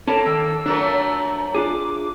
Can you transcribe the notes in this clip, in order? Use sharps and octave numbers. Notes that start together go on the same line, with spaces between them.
A#3 C#4 A4 C#5 A5 B5
D#3 E6
F3 F#3 A3 D4 A#4 A#5
D4 F4 G#4 D6